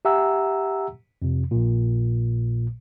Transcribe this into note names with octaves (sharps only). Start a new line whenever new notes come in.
G4 E5 F#5 G#5 A#5 E6
F2 C3
A#1 A#2